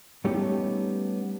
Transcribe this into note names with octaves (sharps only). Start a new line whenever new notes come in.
G3 A3 B3 C#4 D#4 G4